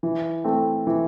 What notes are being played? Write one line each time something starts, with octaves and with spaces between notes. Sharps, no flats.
E3
A3 C4
E3